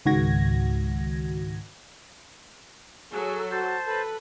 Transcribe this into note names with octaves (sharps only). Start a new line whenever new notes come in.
C#2 G#2 D#3 F#4 G#6 A#6
F#3 G#4 A4
F#4 C5 A5
A4 B4